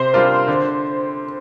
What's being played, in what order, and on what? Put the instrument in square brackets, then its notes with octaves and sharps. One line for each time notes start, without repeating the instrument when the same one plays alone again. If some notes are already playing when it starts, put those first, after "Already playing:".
Already playing: [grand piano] C3 [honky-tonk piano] C5
[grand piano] G3 D4 F4 A#4
D3